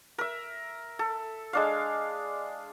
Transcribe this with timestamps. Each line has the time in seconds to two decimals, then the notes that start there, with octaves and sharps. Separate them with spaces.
0.18 A#4 E5
0.99 A4
1.53 G#3 D4 F5